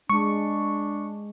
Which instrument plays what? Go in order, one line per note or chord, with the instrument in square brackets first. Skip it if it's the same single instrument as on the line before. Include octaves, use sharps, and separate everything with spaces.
[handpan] G#3 [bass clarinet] D4 [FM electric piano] C#6